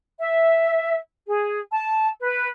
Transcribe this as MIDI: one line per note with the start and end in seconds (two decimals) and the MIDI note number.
0.20 0.97 76
1.28 1.60 68
1.72 2.08 81
2.22 2.48 71